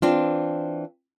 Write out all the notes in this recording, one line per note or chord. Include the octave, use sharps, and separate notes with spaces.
E3 C4 D4 F4